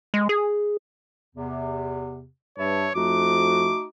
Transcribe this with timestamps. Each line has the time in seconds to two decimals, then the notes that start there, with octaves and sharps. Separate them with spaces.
0.14 G#3
0.29 G#4
1.35 E2 C3
2.58 G2 B4 C#5 E5 A5
2.95 F2 A3 D#4 F#4 D6